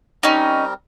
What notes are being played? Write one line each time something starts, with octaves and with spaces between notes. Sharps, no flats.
G3 C4 C#4 D#4 A#4